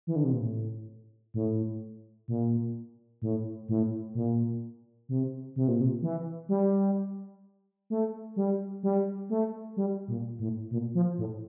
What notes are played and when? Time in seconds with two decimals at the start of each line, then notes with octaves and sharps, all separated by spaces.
0.07 E3
0.16 D3
0.24 C3
0.33 A#2
0.41 A2
1.34 A2
2.28 A#2
3.22 A2
3.69 A2
4.15 A#2
5.09 C3
5.56 C3
5.68 A#2
5.81 C3
6.02 E3
6.49 G3
7.90 A3
8.36 G3
8.83 G3
9.30 A3
9.77 G3
10.08 A#2
10.39 A2
10.71 A#2
10.95 F3
11.18 A2